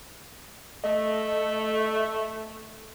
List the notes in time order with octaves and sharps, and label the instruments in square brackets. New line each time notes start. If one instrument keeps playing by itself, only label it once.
[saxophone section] A3 [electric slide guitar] D#5